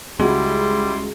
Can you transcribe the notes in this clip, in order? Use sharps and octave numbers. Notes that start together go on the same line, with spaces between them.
C#2 G3 G#3 E4 F#4 C6